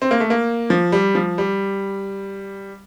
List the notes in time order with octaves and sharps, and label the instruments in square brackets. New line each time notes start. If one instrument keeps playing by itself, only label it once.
[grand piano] C4
A#3
A3
A#3
F3
G3
F3
G3